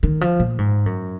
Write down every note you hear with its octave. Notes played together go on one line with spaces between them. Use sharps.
D#3
F3
A#2
G#2
F#2